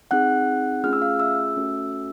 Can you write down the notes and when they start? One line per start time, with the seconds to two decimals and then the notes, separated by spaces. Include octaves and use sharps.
0.11 C4 D#4 G#4 F#5 F#6
0.84 A3 C#4 F4 G#4 F6
0.93 E6
1.02 F5 F6
1.20 E5 E6
1.57 A3 C#4 F#4 A4